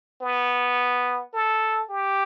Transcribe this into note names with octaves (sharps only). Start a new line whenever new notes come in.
B3
A4
G4